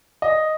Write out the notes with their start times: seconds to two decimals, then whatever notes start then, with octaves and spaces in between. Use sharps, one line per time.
0.22 D#5